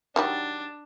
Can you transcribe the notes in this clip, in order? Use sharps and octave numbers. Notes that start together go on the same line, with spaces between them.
D#3 F#3 G3 D4